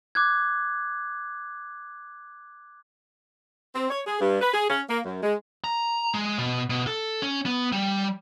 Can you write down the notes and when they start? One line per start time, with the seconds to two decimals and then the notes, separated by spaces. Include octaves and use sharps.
0.15 D6 F#6 G#6
3.75 C4
3.90 C#5
4.07 G#4
4.21 G2
4.42 B4
4.53 G#4
4.69 C#4
4.89 A#3
5.05 F#2
5.23 G#3
5.64 A#5
6.14 G#3
6.39 B2
6.70 B2
6.87 A4
7.22 C#4
7.46 B3
7.72 G3